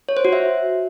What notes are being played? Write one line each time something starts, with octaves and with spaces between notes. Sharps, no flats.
C#5
C5
F#4
E5